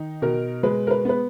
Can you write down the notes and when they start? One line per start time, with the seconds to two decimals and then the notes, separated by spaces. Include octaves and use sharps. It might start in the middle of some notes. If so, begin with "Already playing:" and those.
Already playing: D#3 D#4
0.22 B2 A#4
0.63 G#3 B4
0.87 A#4
0.91 B4
1.05 B3 B4